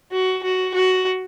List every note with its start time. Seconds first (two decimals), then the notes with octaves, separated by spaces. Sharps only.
0.12 F#4
0.43 F#4
0.74 F#4